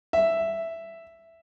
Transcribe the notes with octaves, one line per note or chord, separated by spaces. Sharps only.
E5